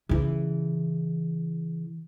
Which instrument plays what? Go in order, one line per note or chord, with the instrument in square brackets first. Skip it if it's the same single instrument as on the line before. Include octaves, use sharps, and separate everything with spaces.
[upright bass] C#3 E3